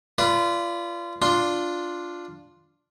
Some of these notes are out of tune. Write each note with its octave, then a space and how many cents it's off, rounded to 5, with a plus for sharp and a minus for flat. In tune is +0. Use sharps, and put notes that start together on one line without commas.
F4 -25 B4 +0 D5 -10
D4 +0 F4 +0 C6 +0